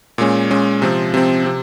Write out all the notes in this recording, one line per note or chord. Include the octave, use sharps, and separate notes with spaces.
A#2 G#3 C#4
A#2 G#3 C#4
C3 F3 C4
C3 F3 C4
C3